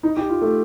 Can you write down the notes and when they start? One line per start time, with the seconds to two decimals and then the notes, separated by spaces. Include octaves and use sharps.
0.03 D#4
0.17 G4
0.29 F4
0.42 A3